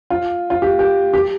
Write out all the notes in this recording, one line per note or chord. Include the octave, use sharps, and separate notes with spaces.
F4
F4
G4
G4
G4